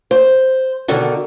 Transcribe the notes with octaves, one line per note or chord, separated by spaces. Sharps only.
C5
B2 D3 D#3